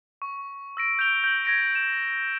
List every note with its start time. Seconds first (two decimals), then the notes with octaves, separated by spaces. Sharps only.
0.22 C#6
0.77 E6 A#6 D7
0.99 G6 D7 F7 G7
1.24 G6 F#7
1.45 G#6 A#6 D7
1.75 E7